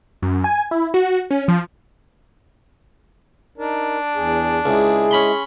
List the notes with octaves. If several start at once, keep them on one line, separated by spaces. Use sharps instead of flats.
F#2
G#5
E4
F#4
C#4
F3
D4 D#4 A#4
E2 G#4
C#2 G#3 E4 G#4
C#4 B5 C6